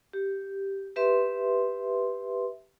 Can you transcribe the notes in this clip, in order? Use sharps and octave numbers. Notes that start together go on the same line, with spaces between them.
G4
G4 B4 E5 C6